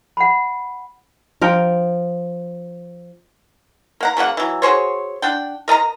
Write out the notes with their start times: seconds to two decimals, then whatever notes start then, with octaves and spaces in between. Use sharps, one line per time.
0.17 F#5 B5
1.41 F3 A#4 G5
4.00 A#3 F#5 A#5
4.17 C#3 F#3 A#3 F#5
4.37 E3 F#3
4.62 F#4 G#4 C5 C#5
5.22 D4 F#5 G5
5.68 A#4 D#5 A5 A#5